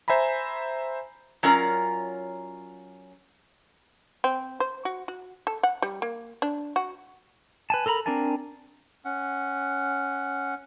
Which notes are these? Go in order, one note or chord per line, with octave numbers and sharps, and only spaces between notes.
C5 E5 G#5 A#5 B5
F#3 C#4 F4 A#4 D5
C4
C5
F#4
F#4
A4
F#5
G3
A#3
D4
F#4
B4 G#5 A5
A4 A#4 A#5 B5
C4 D4 A#4 G#5 A5
C#4 F#5